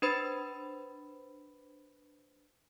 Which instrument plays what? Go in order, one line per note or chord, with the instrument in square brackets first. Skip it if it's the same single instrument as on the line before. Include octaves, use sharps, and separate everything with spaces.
[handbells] D4 B4 C5 B5 A6